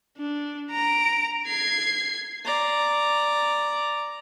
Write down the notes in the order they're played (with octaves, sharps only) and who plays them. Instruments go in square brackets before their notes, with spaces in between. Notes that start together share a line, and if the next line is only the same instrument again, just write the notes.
[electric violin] D4
A#5 D7
G#6 C7
[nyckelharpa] D5 A#5